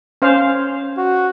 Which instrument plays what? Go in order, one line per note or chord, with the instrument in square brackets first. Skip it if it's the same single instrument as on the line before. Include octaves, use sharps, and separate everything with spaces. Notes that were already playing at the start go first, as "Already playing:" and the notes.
[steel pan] C#4 C5 F5
[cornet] F#4